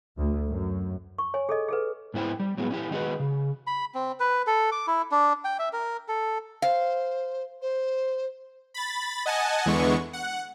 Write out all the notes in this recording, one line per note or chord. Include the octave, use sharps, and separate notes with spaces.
D2
F#2
C#6
C#5 G#5
G#4 A4 D#5
G#4 A4 B4
G#2 B3 E4 C5 G5
G3
A2 F#3 G#3 B3
C#4 E4 G4
D#3 G#3 D#4 E4 F#4 B4
C#3
B5
C4
B4
A4
D6
E4
D4
G5
E5
A#4
A4
C5 F5
C5
B5 A6
D#5 F#5 G#5 A5
E2 D3 E3 G#3 B3 C#6
F#5